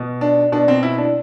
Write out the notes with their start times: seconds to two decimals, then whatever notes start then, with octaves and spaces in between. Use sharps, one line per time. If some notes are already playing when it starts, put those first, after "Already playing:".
Already playing: B2
0.21 D4
0.52 B2 D4
0.68 C4
0.83 E4
0.98 D4